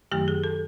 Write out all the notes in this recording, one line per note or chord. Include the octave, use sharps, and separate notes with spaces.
F#2 D#3 F#3 A3 G4
G#4
A4